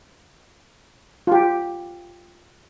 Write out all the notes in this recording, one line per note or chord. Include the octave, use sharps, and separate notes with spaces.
F4 G4